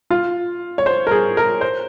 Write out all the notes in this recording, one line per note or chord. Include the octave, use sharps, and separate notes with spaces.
F4
C#5
C5
A#4
G#4
A#4
C5